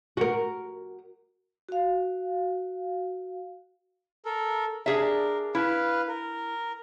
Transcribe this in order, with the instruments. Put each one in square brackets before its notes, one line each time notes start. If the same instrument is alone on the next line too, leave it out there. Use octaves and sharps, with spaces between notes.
[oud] F#4 A#4
[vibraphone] F#4 F5
[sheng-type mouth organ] A4 A#4
[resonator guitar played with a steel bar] D4 G#4 E5 [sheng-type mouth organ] A#4
[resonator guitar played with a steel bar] E4 [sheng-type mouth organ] B4 F5
[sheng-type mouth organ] A#4